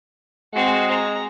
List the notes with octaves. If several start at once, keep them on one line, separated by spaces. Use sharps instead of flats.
G#3 C4 F#4
A#5